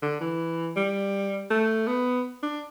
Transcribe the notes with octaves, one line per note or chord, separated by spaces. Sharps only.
D3
E3
G3
A3
B3
D4